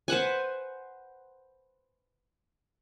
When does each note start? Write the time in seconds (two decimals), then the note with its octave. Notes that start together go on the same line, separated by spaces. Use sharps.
0.08 B4 C5 F#5 G#5